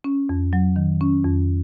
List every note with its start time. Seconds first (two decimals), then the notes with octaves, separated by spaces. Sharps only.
0.04 C#4
0.29 F2
0.53 F#3
0.76 D#3
1.01 C#4
1.24 F2